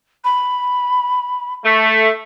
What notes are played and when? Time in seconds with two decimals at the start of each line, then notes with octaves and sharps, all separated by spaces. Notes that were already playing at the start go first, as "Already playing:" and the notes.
0.24 B5
1.65 A3